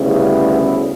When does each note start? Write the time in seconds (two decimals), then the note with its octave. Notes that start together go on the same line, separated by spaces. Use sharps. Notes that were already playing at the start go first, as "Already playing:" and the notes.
Already playing: D2 C#3 G3 B3 E4